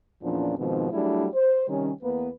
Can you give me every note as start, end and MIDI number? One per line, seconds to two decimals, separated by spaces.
0.22 0.57 40
0.22 0.57 46
0.22 0.57 53
0.22 0.57 61
0.22 0.57 62
0.57 0.91 44
0.57 0.91 47
0.57 0.91 51
0.57 0.91 53
0.57 0.91 60
0.91 1.27 54
0.91 1.27 55
0.91 1.27 57
0.91 1.27 62
0.91 1.27 64
0.91 1.27 68
1.34 1.66 72
1.67 1.90 48
1.67 1.90 51
1.67 1.90 55
1.67 1.90 61
2.02 2.28 40
2.02 2.28 58
2.02 2.28 59
2.02 2.28 71